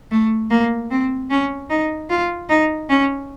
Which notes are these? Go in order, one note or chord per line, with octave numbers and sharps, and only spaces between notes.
A3
A#3
C4
C#4
D#4
F4
D#4
C#4